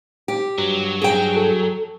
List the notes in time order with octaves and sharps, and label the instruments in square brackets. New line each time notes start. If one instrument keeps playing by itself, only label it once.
[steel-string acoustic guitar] G4
[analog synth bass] G2 [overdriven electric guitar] F#3
[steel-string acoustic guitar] G#4 G5
[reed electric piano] A4